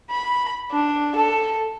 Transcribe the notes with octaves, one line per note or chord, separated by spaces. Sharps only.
B5
D4
A4